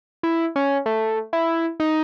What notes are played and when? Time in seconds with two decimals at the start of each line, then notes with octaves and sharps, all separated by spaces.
0.23 E4
0.56 C#4
0.86 A3
1.33 E4
1.80 D#4